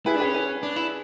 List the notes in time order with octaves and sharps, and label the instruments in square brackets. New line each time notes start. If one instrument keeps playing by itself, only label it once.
[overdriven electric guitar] E4 [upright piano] G#4 B4
[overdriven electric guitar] D4
[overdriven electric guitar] C#4 [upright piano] G#4 B4
[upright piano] G#4 B4
[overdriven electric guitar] D4
E4